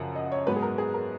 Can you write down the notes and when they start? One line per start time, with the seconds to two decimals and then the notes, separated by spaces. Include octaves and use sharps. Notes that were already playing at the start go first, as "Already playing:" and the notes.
Already playing: F#2 C#3 F3 F#5
0.15 D#5
0.32 C#5
0.47 G#2 F#3 B3 B4
0.56 G#4
0.62 A#4
0.78 G#4
0.94 A#4